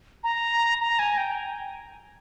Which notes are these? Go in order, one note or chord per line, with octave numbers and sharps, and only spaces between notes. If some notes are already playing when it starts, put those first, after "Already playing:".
A#5
A#5
G#5
G5